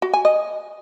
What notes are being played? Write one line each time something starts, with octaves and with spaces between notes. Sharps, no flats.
F#4
G#5
D#5